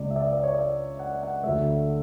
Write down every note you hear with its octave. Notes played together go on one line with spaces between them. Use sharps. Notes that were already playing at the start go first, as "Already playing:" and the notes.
Already playing: C#2 C#3 G#3 D5
E5
D5
E5
D5
C#5
D5
F#5
F#5
D2 D3 A3 E5